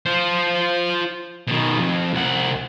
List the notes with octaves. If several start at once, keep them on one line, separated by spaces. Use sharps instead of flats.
F4 C5
B2 D#3
B1 F2
C2 F#5